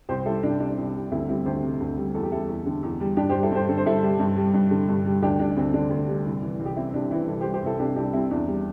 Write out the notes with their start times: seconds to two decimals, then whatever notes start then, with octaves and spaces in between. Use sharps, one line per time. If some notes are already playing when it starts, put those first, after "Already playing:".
0.09 C2 G4 C5
0.26 G3 E4 A4
0.43 C2 D4
0.60 C3 D4
0.77 C2
0.95 G3
1.11 D2 C4 E4
1.28 G3 C4 E4
1.46 D2 G4 C5
1.63 C3
1.80 D2
1.97 G3
2.15 E2 A4
2.23 G4
2.32 G3 E4 A4
2.49 E2
2.66 D3
2.83 E2
3.00 G3
3.17 G2 D4 G4
3.29 G4 C5
3.34 G3
3.43 E4 A4
3.51 G2 G4 C5
3.69 D3 A4
3.77 C5
3.86 G2 E4 A4
4.03 G3
4.20 G2
4.37 G3
4.54 G2
4.71 D3
4.89 G2
5.05 G3
5.22 D2 D4 G4
5.39 G3 D4
5.57 D2 C4
5.74 D3 D4
5.90 D2
6.08 G3
6.25 C2
6.42 E3
6.59 C2
6.66 G4
6.76 C3 C4 E4
6.94 C2 D4
7.11 E3 C4 E4
7.28 C2 E4 A4
7.41 G4 C5
7.45 G3
7.54 G4 C5
7.62 C2 E4 A4
7.79 C3 D4 G4
7.96 C2 D4 G4
8.13 G3 C4 E4
8.31 E2 D4
8.48 G3